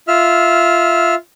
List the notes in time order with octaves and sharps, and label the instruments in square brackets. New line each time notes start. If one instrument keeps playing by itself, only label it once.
[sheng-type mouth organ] F4 E5 F6